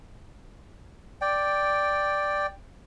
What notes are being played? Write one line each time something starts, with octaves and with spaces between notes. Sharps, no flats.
D5 G5